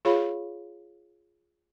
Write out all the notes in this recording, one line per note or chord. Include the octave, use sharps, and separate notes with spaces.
F4 G#4 C#5 F5 B5